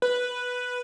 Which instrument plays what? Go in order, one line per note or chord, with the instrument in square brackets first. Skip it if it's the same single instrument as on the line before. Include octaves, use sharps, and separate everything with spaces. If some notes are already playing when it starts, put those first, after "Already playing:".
[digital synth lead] B4